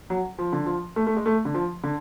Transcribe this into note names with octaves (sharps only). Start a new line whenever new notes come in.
F#3
F3
D3
F3
A3
A3
G#3
A3
D3
F3
D3